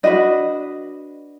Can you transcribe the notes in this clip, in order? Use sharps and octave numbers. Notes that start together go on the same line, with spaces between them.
D4 F#4 B4 D#5